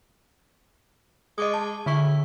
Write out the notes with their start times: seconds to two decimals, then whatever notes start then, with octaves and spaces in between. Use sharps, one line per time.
1.38 G#3 D#5 D6 D#6
1.54 A5
1.86 D3 E4 C#6